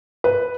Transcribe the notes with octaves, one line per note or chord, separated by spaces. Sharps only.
B4